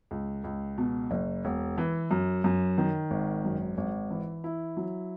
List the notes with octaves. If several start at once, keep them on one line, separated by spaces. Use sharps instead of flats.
C#2
C#2
B2
F#1
E1
E3
F#2
F#2
D#3
G#1
F#2
G#1
E3
E4
F#3